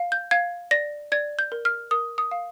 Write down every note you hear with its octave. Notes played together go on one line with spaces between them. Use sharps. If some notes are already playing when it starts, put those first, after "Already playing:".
Already playing: F5
G6
F5 G#6
D5 A#6
D5 G#6
G6
A#4
F6
A#4 D#6
D#6
F5